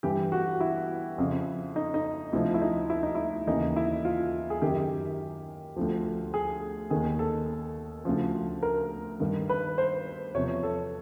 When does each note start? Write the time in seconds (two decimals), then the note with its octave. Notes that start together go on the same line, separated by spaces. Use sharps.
0.03 G2 E3 G4
0.32 F#4
0.60 E4
1.18 F2 C#3 F3
1.76 D#4
1.94 D#4
2.33 D2 C3 F3 E4
2.54 E4
2.61 D#4
2.90 E4
3.03 D#4
3.15 E4
3.47 D#2 C#3 E3 D#4
3.76 E4
4.05 F4
4.50 G#4
4.62 F#2 D#3 G4
5.76 D2 D3 F3
6.34 G#4
6.90 D#2 D#3 G#4
7.19 A4
8.05 D2 C#3 F3
8.63 A#4
9.20 G2 D#3
9.49 B4
9.78 C5
10.34 E2 C3 F3 C#5
10.63 A4